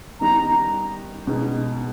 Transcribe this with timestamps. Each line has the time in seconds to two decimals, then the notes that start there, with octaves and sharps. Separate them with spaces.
0.21 D#3 G3 B3 D#4 A#5
1.27 B2 G#3 B3 D#4